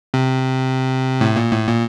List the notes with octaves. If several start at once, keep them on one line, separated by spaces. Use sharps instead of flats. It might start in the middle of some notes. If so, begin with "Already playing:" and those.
C3
A2
A#2
A2
A#2